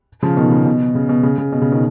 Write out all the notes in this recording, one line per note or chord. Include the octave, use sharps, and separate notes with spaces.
C#3 F3
B2 D#3
C#3
B2
C#3
B2
C#3
C#3
B2
C#3
B2 D#3